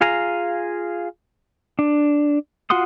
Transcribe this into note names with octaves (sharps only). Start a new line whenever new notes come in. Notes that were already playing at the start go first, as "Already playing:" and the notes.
F4 G#4 F5 G#5 A#5
D4
F4 F#4 F#5 C6 D#6